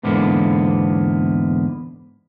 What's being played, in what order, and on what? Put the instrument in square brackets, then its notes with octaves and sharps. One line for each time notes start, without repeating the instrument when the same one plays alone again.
[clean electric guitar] E2 G#2 D3 A#3 B3